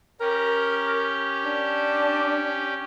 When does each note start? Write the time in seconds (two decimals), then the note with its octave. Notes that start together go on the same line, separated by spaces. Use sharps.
0.21 C#4 G4 A#4
1.45 D4